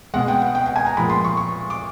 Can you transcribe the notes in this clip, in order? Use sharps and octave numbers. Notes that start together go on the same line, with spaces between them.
B2 G#3 F#5
G5
F#5
G5
G5
G#5
A#5
A#2 F3 G#3 B5
C6
C#6
C#6
D6